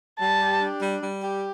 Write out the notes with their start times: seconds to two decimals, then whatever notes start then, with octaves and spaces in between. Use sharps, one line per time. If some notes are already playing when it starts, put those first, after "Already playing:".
0.19 G3 A5
0.41 G4
0.60 D4
0.81 G3
1.01 G3
1.22 G4